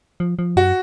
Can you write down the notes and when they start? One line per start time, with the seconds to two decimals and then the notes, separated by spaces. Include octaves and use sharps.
0.20 F3
0.39 F3
0.56 F#2 F#4